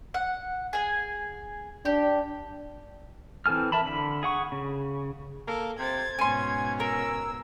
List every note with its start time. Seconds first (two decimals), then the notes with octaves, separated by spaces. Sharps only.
0.14 F#5
0.73 G#4 G#5
1.85 D4 G4
3.46 E3 C4 A4 G#5 F6
3.72 A#4 E5 A5 B5
3.85 D3 B5
4.23 G#4 F#5 C#6
4.52 C#3
5.48 A#3 A4
5.79 C3 C5 G#6 A6
6.19 G#2 B2 C#4 G#5 C6
6.80 A#4 E6